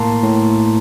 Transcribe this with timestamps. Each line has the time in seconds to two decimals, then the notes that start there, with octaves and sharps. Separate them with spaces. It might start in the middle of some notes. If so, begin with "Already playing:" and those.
Already playing: A2 A#3 A5 A#5 C6
0.23 A2